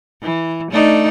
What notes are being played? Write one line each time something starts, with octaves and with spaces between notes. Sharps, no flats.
E3
A3 D4 D#4